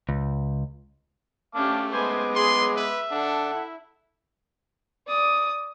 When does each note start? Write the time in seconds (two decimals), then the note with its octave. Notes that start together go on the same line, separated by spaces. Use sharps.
0.09 C#2
1.55 A3 C#4 G4 F5 A5 D6
1.91 G#3 B3 C5 G#5 D6
2.35 G#4 C6
2.76 B4 E5
3.11 D4 A4 F#5
3.54 E4
5.07 D5 D#6